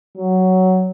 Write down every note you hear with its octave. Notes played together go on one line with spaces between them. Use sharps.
F#3